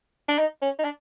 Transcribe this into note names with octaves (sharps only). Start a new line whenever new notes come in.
D4
D#4
C#4
D#4
D4